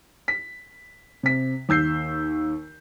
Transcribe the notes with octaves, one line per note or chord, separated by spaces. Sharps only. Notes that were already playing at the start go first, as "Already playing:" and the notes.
B6
C3 B6
D#2 E6 G6 C7